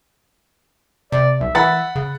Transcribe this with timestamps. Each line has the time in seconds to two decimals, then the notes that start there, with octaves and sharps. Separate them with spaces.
1.12 C3 D5
1.40 B1 E5
1.55 E3 F#5 B5 A6
1.96 C#3